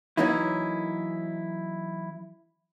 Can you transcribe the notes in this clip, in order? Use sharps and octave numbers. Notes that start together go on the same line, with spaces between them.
E3 F#3 A#3 C#4 D#4 E4